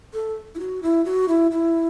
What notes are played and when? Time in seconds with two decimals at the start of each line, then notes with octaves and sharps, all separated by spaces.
0.14 A4
0.55 E4
0.59 F#4
0.83 E4
1.05 F#4
1.28 E4
1.51 E4